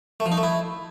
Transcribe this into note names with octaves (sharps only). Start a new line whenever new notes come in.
A3
F3
D#4
A3
E4